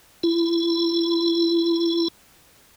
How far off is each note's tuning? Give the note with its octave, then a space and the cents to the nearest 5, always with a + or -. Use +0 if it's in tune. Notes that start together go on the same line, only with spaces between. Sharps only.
E4 +35